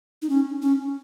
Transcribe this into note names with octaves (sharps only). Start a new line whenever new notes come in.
D#4
C#4
C#4